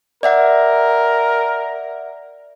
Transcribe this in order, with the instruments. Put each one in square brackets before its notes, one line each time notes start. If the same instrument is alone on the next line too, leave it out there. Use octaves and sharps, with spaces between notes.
[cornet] A#4 [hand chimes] D5 E5 F#5